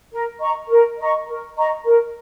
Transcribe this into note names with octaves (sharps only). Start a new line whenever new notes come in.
A#4
D#5 A#5 C#6
A#4
D#5 A#5 C#6
A#4
D#5 A#5 C#6
A#4